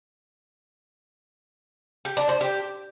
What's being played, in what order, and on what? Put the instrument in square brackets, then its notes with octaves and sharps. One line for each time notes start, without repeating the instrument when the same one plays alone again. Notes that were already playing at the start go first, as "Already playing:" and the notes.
[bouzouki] G4
D4
C5
G4